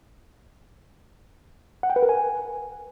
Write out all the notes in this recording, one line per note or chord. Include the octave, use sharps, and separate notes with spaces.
F#5
G5
B4
A#4
G#5